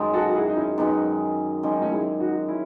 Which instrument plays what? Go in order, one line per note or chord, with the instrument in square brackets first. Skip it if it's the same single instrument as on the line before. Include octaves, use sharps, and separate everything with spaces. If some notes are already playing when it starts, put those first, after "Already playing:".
Already playing: [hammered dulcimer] F#2 D#3 G#3
[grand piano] F#4 A4
F#4
E4 G#4
D#4
C#4 E4
[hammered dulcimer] F#2 D#3 G#3 [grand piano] B3 D#4
[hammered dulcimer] F#2 D#3 G#3 [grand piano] C#4
[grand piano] D#4
A3 C#4
E4 G#4
D#4 F#4
C#4 E4